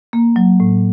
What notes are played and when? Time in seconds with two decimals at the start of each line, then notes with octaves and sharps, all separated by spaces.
0.13 A#3
0.36 F#3
0.60 A2